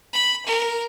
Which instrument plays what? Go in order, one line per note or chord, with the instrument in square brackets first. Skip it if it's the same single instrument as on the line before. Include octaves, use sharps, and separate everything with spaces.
[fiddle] B5
A#4